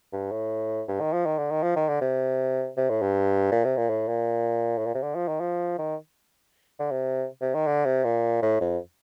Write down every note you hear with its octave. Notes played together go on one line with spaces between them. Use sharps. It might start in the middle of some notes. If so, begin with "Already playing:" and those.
G2
A2
G2
D#3
F3
D#3
D3
D#3
F3
D#3
D3
C3
C3
A2
G2
A#2
C3
A#2
A2
A#2
A2
A#2
C3
D3
F3
D#3
F3
D#3
D3
C3
C3
D#3
D3
C3
A#2
A2
F2